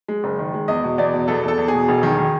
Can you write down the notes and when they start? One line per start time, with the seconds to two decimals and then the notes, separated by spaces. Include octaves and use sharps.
0.08 G#3
0.24 F#1
0.39 D#3
0.54 G#3
0.68 E2 D#5
0.84 B2
0.98 E2 D5
1.13 B2
1.28 E2 A4
1.43 E2 A4
1.58 E2
1.68 G#4
1.73 B2
1.88 E1
2.03 D#3
2.18 D#3